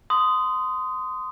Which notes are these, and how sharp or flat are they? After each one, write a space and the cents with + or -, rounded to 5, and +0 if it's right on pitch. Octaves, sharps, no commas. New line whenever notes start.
C6 -20 D#6 +0